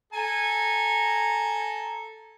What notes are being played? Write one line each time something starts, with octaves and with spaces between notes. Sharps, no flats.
A4 G#5 A#5